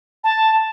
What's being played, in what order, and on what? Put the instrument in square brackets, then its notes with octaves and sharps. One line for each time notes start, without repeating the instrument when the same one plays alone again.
[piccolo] A5